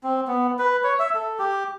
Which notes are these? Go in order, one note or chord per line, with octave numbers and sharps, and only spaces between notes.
C4
B3
B4
C#5
E5
A4
G4